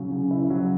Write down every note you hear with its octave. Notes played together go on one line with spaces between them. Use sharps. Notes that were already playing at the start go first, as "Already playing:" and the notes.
Already playing: C#3 F#3
C#3
E4
F#3